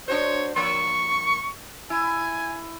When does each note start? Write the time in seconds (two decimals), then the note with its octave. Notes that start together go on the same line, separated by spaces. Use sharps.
0.08 D4 F#4 C5 C#5
0.56 F3 A#3 C#6
1.90 E4 G#5